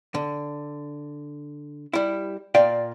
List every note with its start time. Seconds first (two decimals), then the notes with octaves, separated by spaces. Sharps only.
0.15 D3
1.93 G3 E4
2.55 A#2 D5 F5 G5